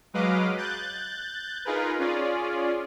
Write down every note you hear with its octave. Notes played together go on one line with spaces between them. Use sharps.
F#3 G#3 B4 D#5 F5 D6
F#6 G6 A6
D#4 F4 G#4 A#4 B4
C#4 F4 G#4 D5